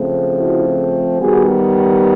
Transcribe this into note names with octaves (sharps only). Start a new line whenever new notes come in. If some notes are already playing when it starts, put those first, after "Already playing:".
Already playing: C#3 F3 A3 C4
E4 F#4
D#3 G3 B3 F#4 G#4